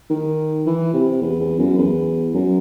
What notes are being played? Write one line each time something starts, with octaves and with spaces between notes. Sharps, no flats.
D#3
E3
C3
E2
E2
F#2
E2
F#2